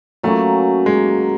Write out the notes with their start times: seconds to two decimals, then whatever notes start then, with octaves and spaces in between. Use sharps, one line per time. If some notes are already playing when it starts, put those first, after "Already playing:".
0.23 F#3 A3 A#3 C#4
0.86 G#3